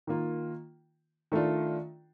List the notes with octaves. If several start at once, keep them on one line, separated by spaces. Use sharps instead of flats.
D#3 A#3 F4
D#3 A3 D4 F4